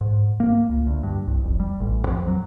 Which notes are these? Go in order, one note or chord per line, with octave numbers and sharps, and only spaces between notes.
G#2
A#3
C#2
D2
G2
C2
F1
G3
A1
F2
F#3